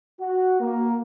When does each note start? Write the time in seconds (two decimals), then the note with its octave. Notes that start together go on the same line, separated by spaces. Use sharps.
0.20 F#4
0.60 A#3